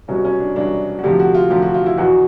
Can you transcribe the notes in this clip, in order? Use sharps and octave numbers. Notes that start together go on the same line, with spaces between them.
C2 B2 F#3 C#4
C#4
D4
C2 B2 F#3 D4
F#4
D2 C3 F3 G4
F#4
F4
D2 C3 F3 G4
F#4
F4
E4
E2 B2 F#3 F#4